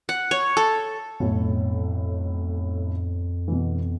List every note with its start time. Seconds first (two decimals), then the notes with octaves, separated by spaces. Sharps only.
0.09 F#5
0.31 C#5
0.57 A4
1.20 B1 F2 A2
3.48 B2 E3